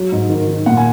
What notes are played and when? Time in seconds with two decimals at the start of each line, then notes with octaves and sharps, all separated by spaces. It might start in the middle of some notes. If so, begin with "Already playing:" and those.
Already playing: F#3
0.12 G#2
0.30 D#3
0.48 D#3
0.66 A#2 F#5
0.77 G#5